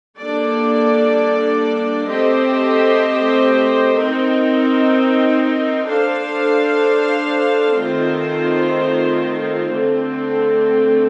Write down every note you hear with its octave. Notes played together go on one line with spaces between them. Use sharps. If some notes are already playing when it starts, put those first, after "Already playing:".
G3 A#3 D4 A4 D5
A3 C4 G4 C5 D#5
C4 D#4 A#4
D4 A4 C5 F5
D#3 A3 C4 F4 C5
D3 A3 C4